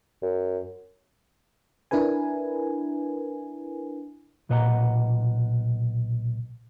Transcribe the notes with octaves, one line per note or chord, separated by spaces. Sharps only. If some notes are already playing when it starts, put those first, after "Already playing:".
F#2
D4 E4 A#4 B4 G#5
B1 A#2 B4 D#5 F#5 A#5